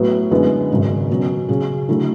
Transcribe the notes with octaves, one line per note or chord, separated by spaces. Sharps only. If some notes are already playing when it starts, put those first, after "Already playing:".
Already playing: A2 F#3 B3 F#4 B4
F#2 D3 G#3 B3 E4
G#1 F#2 C#3 G#3
B2 F#3 C#4
C#3 F#3 C#4 G#4
D3 F#3 A3 E4